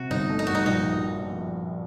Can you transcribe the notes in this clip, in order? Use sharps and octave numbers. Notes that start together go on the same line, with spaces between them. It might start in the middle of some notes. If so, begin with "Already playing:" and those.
Already playing: C3 F#4
G1 D#4
A3
D#4
G2 F#4
D#4
A#1 D#4